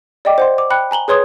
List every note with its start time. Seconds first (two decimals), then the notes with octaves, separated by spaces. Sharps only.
0.25 D5 D#5 G5 D6
0.38 C5 F#5 C6
0.58 D6
0.70 G5 B5 F#6 C#7
0.91 G#5 A#5 F#7 G7
1.08 G#4 B4 C#5 C6 D#6 G#6